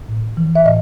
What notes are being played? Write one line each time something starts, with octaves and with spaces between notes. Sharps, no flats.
A2
E3
E5
A2 D#5